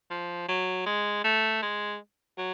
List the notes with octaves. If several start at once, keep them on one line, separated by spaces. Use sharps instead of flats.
F3
F#3
G#3
A3
G#3
F#3